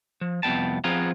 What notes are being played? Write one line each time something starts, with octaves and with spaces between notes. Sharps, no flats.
F3
C2 F2 B3 G5 A5
F3 B3 C4 F4 G#4 A#5